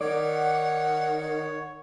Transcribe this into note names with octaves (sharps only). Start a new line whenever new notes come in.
D#3 C#5 D5 F#5